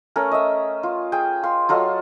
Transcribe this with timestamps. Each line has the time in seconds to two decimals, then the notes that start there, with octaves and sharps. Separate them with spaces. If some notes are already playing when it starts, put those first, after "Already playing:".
0.16 A3 C#4 A#4
0.32 D#5 E5
0.83 F4
1.12 G#4 G5
1.43 F5 C6
1.69 F#3 F4 A4 D#5